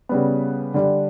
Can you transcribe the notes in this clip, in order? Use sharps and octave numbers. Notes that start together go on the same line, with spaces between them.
C#3 G3 B3
D3 G3 D4